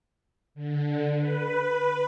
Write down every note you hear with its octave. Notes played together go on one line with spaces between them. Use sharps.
D3
B4